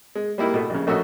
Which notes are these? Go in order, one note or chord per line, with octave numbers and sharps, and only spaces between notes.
G#3
G3 G#3 A#3 D#4 E4
B2 A3
A#1 C#3
A#1 A3 C#4 F#4 D#5 E6